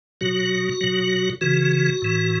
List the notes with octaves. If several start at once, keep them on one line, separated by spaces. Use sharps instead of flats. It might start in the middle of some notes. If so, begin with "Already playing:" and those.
B2 F#3 F#4
B2 F#3
C#3 E3 F#4
A2 E3